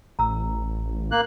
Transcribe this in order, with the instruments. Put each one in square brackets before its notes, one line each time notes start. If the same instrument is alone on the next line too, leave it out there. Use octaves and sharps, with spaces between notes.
[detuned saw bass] A1 [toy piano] A#5 E6
[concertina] A#3 F#6